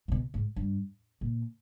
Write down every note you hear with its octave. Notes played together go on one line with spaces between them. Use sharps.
A#2
B2
G#2
G2
A#2